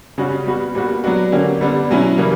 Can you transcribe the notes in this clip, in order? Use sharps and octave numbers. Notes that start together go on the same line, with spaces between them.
C#3 G3 C#4 F#4
G3 B3 F#4
A#2 G3 B3 F#4
F#3 B3 D4 F#4
D3 A#3 C#4 G4
D3 G3 B3 D4
B2 F#3 C#4 E4
C#3 E3 G3 A#3